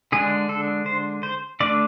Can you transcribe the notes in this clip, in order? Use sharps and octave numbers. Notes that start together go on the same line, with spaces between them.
D3 G#3 D4 G#4
A4
C5
C5
D3 A3 D4 D5